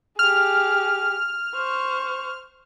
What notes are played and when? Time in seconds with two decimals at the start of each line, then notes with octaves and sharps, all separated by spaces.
0.19 G4 G#4 F6
1.56 C5 C#6